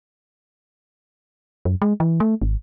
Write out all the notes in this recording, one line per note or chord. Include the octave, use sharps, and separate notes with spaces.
F#2
G#3
E3
A3
G#1